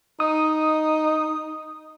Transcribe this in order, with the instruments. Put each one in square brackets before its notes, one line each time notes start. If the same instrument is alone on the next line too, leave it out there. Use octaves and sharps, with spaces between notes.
[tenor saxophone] D#4 [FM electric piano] D#6